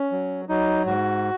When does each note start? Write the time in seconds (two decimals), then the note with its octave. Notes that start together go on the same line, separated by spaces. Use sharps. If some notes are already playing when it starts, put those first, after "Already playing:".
Already playing: C#4
0.12 F#3
0.49 F#3 D#4
0.86 G#2 F#4